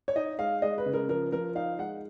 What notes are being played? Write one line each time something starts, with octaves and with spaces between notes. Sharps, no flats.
C#5
D#4 D#5
G#3 F5
G#3 D#5
B4
C#3
A#4
F3 A#4
F3 A#4
D#4 F5
G#3 F#5